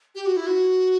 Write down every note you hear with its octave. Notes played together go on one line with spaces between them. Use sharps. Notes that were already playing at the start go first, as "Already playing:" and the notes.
G4
F#4
E4
F#4